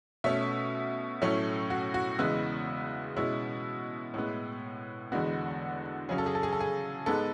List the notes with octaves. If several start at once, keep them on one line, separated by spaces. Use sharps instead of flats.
B2 A3 C#4 E5
A2 F#3 A3 C#4
F#4
F#4
E2 C#3 G#3 B3 E4
B2 G#3 C#4 E4
A2 G#3 B3
E2 D3 G#3 B3 F#4
C#3 F#3 C#4 G#4
A4
G#4
A4
G#4
A4
G#4
G#2 G#3 B3 A4